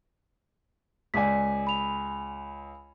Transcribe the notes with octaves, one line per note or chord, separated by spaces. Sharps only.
C#2 D5 G#5 D6 B6
B5 F7